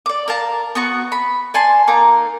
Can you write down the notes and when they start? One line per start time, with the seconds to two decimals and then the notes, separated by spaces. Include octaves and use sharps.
0.06 D5 D6
0.28 A#4 F5 A5
0.75 B3 F#4 C#6
1.12 B5
1.54 D5 G#5 A5 C6
1.88 A#3 D#4 A#5